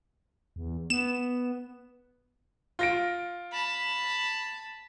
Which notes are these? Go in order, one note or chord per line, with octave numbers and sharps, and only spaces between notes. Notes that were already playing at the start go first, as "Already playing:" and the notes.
E2
B3 E7
F4 A#6 D7
A5 B5